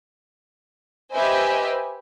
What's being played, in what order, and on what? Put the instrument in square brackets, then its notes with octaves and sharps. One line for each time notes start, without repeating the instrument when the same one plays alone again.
[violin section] G4 B4 C5 D#5 E5 G#5